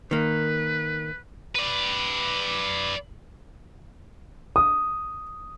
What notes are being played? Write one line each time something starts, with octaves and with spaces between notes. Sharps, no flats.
D#3 A#3 B4
B4 D5
D#6